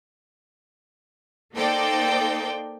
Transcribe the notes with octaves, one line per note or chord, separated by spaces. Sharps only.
A#3 D#4 A4 C5 D5 G5